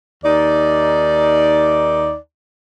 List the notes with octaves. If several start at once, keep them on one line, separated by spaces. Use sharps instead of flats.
D#2 D#4 D5